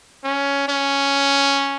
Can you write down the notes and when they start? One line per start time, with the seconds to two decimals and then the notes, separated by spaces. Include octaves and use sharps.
0.24 C#4
0.69 C#4